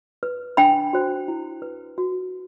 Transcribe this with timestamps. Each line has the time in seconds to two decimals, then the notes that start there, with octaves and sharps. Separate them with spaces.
0.23 B4
0.57 D4 G5 B5
0.93 F#4 C5
1.28 E4
1.62 B4
1.98 F#4